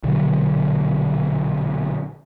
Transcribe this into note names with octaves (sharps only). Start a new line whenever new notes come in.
A#1 B2 D3 F#3